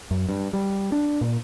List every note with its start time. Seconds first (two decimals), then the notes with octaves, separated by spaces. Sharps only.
0.11 F#2
0.29 G2
0.53 G3
0.92 D4
1.21 A#2